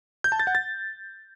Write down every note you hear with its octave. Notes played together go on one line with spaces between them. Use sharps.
G6
A5
A6
F#5
A6